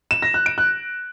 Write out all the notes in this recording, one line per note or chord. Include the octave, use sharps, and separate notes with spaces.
E7
A#6
F#6
D7
F#6